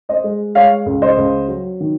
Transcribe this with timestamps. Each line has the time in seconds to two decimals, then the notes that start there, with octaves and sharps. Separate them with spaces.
0.09 C5 D#5
0.24 G#3
0.55 G#3 C#5 F5
0.86 C#2
1.02 C5 D#5
1.17 C#2
1.48 F#3
1.80 D#3